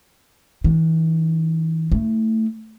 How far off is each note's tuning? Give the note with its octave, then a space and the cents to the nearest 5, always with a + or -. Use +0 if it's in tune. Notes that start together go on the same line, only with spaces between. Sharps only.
E3 -35 D4 +5
A3 +15 E4 -45